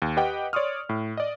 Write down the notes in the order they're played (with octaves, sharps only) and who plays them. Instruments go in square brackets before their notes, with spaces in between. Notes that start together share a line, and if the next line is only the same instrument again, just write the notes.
[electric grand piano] D#2
G4 B4 D#5 F#5 G5
C#5 D5 C6 C#6 D#6 F6
A2
D5 D#5